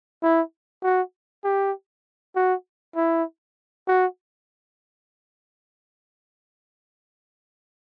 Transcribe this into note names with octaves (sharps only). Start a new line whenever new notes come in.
E4
F#4
G4
F#4
E4
F#4